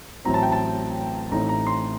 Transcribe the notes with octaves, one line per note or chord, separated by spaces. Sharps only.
A1 A2 F#3 C4 A#5
A5
G5
A5
A1 A2 A3 C4 D#4 A#5
A#5
C6